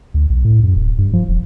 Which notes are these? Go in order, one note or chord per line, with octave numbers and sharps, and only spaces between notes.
D2
B1
A2
F#2
D1
G2
F3
E1